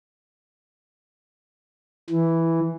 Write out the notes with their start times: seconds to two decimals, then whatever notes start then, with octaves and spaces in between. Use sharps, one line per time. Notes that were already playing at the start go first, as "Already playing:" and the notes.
2.10 E3